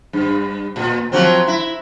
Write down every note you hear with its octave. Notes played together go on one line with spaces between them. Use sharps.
G2
A#2
F3 F#3 C4
E4